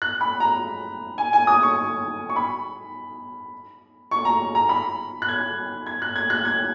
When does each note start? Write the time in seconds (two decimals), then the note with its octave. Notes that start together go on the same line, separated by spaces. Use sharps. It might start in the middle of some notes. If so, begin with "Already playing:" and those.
0.02 F#6
0.21 B5
0.40 A#5
1.18 G#5
1.33 G#5
1.47 D#6
1.63 C#6
2.30 C#6
2.36 B5
4.11 C#6
4.25 A#5
4.55 A#5
4.69 B5
5.22 F#6
5.29 G#6
5.86 G#6
6.02 F#6
6.16 G#6
6.30 F#6
6.45 G#6